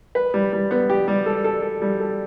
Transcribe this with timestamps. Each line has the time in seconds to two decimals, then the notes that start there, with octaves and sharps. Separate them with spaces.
0.15 B4
0.34 G3
0.53 G3
0.71 B3
0.90 G4
1.08 G3
1.26 A4
1.44 A4
1.62 A4
1.82 G3
2.00 A4